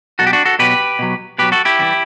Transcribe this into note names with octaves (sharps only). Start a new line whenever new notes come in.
B2 F#3 F#4 A4
G4
D4 F#4
F#4 A4
B2 F#3 G4 B4
B2 F#3
B2 F#3 G4 B4
F#4 A4
E4 G4
C3 E3 G3